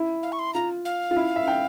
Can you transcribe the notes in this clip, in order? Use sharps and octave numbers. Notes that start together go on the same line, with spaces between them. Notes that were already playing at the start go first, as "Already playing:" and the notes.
Already playing: E4
F5
C#6
C6
F4 A#5
F5
F4
E4
E5
G5